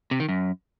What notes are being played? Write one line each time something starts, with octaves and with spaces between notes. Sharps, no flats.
C3
D#3
F#2